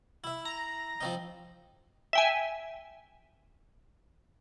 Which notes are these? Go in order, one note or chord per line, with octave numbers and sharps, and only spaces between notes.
E4 E5
A#5
F3 C4 D#4
E5 G5 G#5